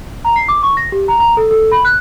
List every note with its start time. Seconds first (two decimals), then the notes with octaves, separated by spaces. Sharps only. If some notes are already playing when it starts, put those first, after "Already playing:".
0.25 A#5
0.36 C7
0.48 D6
0.63 C#6
0.77 A#6
0.92 G4
1.08 A#5
1.20 A#5
1.37 A4
1.51 A4
1.72 B5
1.85 F#6